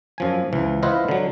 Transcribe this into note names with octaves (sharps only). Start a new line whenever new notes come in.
F#2 F3 G#5
C#2 E3 F3
E4 F4 B4 C5 D#5 F#5
D3 F#3